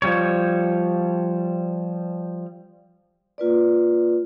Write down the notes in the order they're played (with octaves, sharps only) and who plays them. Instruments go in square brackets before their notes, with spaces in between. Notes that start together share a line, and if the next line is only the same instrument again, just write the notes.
[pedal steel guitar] F3 G3 C#5
[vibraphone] A#3 F4 B4 D5